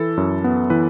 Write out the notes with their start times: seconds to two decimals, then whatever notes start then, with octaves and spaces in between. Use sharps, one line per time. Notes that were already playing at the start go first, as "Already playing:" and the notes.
Already playing: E3 E4 A4
0.17 F#2
0.44 B3
0.70 E3 B4